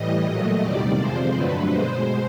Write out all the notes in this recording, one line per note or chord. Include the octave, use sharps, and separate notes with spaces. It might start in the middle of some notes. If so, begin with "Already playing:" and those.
Already playing: A2 E3 G3 D#5
A#2 F#3 A3
E2 C3 D#3 G3 D5
F2 C3 F3 G#3 C5
G2 D3 F#3 A3 B4
B2 G#3 C5